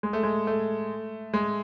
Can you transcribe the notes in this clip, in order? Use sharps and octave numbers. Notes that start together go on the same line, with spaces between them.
G#3
A3
G#3
A3
G#3